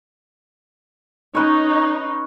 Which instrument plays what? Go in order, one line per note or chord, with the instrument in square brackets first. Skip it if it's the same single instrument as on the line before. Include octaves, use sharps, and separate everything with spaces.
[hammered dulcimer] C#4 B4 C#5 [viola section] D#4